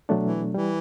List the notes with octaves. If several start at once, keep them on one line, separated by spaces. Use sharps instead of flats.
B2 F#3 A3 D4
E3
E3 G3